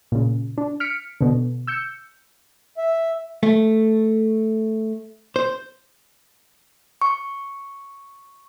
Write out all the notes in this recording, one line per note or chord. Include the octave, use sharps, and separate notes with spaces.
A#2 C#3
D4
F6 B6 C#7 D7
B2 D3
E6 G6 C#7
E5
A3
C5
C#6